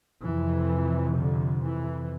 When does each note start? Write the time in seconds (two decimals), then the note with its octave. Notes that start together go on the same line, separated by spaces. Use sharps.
0.23 F2 C3 E3
1.17 D3
1.65 E3